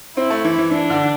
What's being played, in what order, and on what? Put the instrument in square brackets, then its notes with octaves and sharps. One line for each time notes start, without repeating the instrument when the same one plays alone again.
[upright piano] C4 [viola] E4
[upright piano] A3
E3
E3
[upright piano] E3 [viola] D4
[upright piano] D3